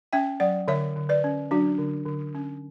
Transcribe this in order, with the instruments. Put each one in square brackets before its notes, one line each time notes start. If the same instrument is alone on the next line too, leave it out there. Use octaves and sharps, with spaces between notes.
[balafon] C#4 E5 G5
F#3 D5 F#5
D3 C#5 E5
D3
B4 D5
C#4
F#3 D4 F#4
D3
D3
C#4